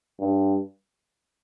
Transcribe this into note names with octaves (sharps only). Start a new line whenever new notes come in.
G2